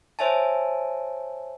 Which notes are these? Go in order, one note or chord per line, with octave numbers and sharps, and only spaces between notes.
C5 C#5 E5 G#5 A5